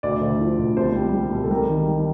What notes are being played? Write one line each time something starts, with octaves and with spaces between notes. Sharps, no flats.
D2 D5
D2
F3
D2
C2 C5
G3
G3
C2
A4
G3 A#4
D#3
G3